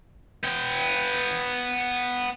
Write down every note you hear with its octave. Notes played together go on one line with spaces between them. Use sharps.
B3 G5